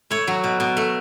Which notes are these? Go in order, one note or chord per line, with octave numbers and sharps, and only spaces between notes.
A3 C#5
F#3
B2
B2
A3